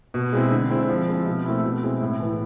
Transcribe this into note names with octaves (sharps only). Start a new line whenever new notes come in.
B2
G#3 C4 E4
D3
G#3 C4 E4
F3
G#3 C4 E4
B2
A3 C4 E4
B2
G#3 C4 E4
A2
E3 B3 E4